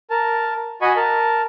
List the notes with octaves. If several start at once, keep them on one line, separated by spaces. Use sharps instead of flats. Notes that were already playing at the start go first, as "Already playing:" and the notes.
A#4 A5
F#4 D#5 G#5 B5 C#6
A#4 A5